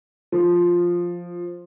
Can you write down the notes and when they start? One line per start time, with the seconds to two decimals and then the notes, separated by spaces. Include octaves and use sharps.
0.32 F3